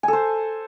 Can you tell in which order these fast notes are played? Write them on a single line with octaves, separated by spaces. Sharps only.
G#5 A4 C5